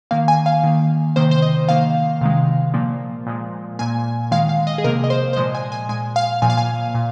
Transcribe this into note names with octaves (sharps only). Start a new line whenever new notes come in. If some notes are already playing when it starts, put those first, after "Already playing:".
D#3 A#3 F5
G#5
F5
D#3 A#3
C3 D#3 A#3 C5
C5
D#5
D#3 A#3 F5
C3 D#3 G#3
A#2 F3 A#3
A#2 F3 G#3
A#2 A#3 G#5
D#3 G#3 F5
F5
D#5
G#4
C3 F3 A#3 A#4
D#5
C5
C5
A#2 F3 G#3 D#5
G#5
G#5
A#2 G#3 G#5
F5
A#2 F3 A#3 G#5
F5
G#5
A#2